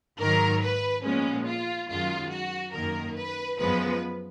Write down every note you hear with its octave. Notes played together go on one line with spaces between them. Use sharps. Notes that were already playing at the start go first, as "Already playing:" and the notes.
G#2 D#3 F#3 A#4
B4
A#2 F3 G#3 B3 C#4
F4
F#2 D#3 G#3 F4
F#4
F#2 D#3 A#3 A#4
B4
F#2 F3 G#3 B3 B4